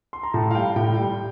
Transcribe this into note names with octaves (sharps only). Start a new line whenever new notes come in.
C6
A#5
A2 A5
F5
G3 G5
A2 G5
G3